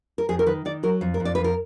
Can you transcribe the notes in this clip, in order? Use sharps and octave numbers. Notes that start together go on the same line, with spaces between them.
A#4
F2 G#4
A#4
D#3 B4
D#3 D5
F#3 A#4
F2
A#4
F2
D5
F2 B4
A#4